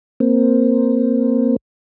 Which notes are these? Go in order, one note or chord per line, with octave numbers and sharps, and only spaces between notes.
A#3 C4